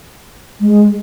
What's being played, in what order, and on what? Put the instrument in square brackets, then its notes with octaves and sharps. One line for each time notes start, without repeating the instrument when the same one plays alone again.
[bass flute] G#3